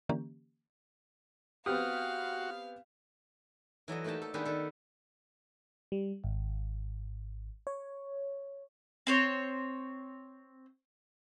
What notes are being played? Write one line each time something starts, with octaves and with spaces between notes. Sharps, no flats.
D3 E3 A#3 C#4 G4
B3 C4 F#4 G4 F5 D#6 F6
E3 F#3 A4 D#5
A3 A#3 D#4 G4 A5
A4
D#3 G#3 B3 D4 G4 B4
D#3 A4
G3
G#1
C#5
C4 C5 C#5